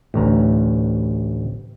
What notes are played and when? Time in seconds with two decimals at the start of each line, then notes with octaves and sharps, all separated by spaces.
0.14 A1 D2 A#5